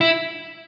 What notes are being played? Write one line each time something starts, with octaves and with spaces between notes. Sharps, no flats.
E4